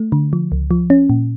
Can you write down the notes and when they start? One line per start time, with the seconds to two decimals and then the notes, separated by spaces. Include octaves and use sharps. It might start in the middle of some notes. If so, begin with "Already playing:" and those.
Already playing: A3
0.12 D3
0.33 F3
0.52 C#2
0.71 F3
0.90 C#4
1.10 A#2